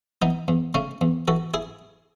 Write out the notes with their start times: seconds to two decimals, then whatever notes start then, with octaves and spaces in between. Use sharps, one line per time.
0.22 E3 B3 D#4
0.48 E2
0.74 C#3 A3 C#4
1.01 E2
1.28 E3 F#4 A4
1.54 E4 G#4